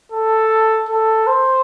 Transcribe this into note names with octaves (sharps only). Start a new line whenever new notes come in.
A4
A4
C5